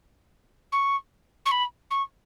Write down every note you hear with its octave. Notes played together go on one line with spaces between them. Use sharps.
C#6
C#6
B5
C#6